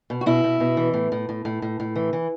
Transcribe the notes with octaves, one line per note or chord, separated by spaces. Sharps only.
B2
F#4
B2 E4
B2
B2
E3
A2
A2
A2
A2
A2
A2
E3
E3